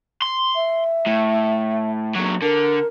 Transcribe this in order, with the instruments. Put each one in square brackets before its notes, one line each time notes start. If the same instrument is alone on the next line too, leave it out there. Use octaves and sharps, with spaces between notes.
[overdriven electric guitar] C6
[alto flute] E5
[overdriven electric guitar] A2
A#2 F#3
[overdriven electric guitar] D3 [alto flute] A#4